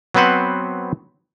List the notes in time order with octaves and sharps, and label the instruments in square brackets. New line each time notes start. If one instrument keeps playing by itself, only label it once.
[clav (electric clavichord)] F#3 B3 C4 B4 C5 F#5